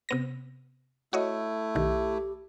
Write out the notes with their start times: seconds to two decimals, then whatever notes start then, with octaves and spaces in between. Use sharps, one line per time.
0.09 C3 B3 A#6
1.13 A3 E4 F#4 C#5 D#5
1.75 B1 D#3 G4